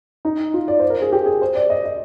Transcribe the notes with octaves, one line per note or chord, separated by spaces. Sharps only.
D#4
F4
D5
C5
A#4
G#4
G4
G#4
C5
D5
D#5
D#5